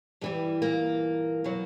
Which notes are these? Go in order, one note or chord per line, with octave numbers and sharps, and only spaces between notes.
G2 E3 G3 G#3
A#2 A#3
B2 F#3